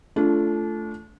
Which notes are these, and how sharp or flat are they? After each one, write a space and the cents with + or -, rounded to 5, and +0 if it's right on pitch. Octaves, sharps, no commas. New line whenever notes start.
A3 -5 D4 -30 F4 -25